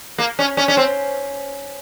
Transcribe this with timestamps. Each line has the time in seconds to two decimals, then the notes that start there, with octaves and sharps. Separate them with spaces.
0.18 A#3
0.39 C#4
0.57 C#4
0.68 C#4
0.77 C4